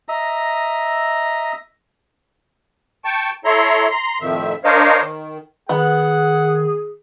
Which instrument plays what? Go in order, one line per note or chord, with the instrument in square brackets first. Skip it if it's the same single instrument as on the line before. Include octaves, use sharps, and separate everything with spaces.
[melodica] D#5 E5 A#5
[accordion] G5 A5 C#6
E4 A4 C#5 E5 A#5 C6
A#5 C6
F2 A2 D#3 F3 E5
D4 A#4 C5 C#5 D#5 F5
D#3
[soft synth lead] D#3 [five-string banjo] B3 [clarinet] G#4 [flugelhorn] F#5